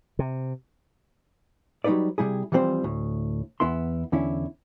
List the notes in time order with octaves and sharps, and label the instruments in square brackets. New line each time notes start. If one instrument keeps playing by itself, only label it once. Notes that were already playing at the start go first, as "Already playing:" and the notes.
[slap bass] C3
[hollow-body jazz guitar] F#3 G3 D#4 F#4 B4 D5
C3 G3 E4 G#4
E3 F3 G3 C4 C5
D2 A2
E2 B3 E4 C6
E2 D3 C#4 E4